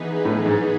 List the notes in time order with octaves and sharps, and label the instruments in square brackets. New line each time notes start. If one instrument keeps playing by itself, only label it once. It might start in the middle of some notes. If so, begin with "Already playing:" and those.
Already playing: [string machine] E3 B3 D#4 G#4 B4
[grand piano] A2
G#2